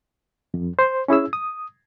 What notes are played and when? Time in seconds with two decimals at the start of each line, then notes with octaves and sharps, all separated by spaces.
0.54 F2
0.79 C5
1.08 C#4 E4 G#4 E6
1.33 D#6